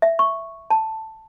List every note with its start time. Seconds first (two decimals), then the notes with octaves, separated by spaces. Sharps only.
0.02 E5
0.19 C#6
0.70 A5